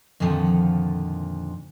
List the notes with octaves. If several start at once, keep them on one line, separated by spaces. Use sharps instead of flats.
F2 A#2 D3 D#3 F3